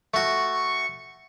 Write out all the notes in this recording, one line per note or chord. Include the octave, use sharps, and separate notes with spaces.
A3 F#4 C#6